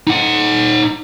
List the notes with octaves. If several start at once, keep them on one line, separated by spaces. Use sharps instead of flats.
D#4 F#5